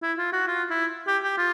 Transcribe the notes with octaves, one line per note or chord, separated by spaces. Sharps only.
E4
F4
F#4
F4
E4
G4
G4
F4